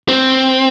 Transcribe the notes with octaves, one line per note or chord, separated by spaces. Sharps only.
C4